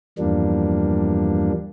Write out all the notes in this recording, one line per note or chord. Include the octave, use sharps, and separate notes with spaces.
E2 G2 F3 G3 A#3 D4